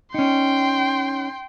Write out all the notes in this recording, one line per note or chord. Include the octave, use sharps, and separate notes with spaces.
C#4 D#4 G5 C6